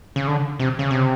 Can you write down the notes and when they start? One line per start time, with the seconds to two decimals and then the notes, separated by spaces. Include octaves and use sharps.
0.16 C#3
0.27 D3
0.59 C3
0.79 C#3
0.91 C3